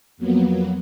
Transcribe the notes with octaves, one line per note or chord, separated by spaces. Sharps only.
F2 F#3 A#3 B3